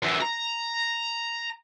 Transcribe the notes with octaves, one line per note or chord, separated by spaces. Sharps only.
F#2 E3
A#5